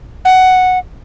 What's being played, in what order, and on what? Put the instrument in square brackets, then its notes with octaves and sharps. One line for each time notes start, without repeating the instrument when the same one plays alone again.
[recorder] F#5